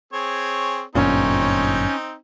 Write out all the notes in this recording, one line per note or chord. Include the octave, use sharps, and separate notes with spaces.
C4 G#4 C#5
G1 F#2 A#2 C4 C#4 D#4